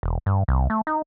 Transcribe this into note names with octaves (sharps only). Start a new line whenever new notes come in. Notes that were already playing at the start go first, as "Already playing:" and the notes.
E1
G2
C2
A3
D#4